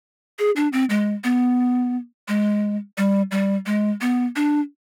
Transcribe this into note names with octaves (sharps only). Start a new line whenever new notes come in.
G#4
D4
C4
G#3
B3
G#3
G3
G3
G#3
B3
D4